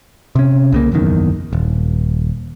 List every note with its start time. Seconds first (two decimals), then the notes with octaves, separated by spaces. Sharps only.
0.35 C3 C#4
0.72 C2 C#3 A#3
0.92 F#1 B1 E2 D#3
1.53 D#1